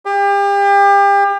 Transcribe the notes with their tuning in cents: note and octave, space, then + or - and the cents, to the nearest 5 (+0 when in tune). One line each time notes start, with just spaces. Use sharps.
G4 +35